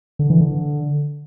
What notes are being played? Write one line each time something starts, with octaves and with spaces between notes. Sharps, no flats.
D3
E3
D3